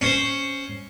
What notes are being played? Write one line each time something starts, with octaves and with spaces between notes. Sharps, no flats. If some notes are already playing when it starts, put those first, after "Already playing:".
C#4 C5